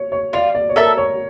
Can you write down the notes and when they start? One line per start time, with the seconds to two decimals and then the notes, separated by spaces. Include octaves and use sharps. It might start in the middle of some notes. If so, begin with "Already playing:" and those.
Already playing: C#5
0.12 C#5
0.33 F4 D5
0.55 D5
0.69 C#5
0.76 A4 A#4 E5 A5
0.97 C#5